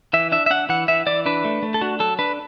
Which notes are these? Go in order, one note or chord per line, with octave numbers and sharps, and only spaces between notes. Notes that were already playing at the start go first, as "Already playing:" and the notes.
E3 E5
D4 E5
E5
D4 F#5
E3 F#5
E3 E5
E3 D5
D4 B4
A3
A3
A4
D4 F#4
F#3 A4
D4 B4